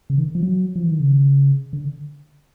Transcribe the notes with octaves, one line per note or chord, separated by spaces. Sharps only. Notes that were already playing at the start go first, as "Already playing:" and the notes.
C#3
D#3
F3
F#3
F3
E3
D#3
C#3
D3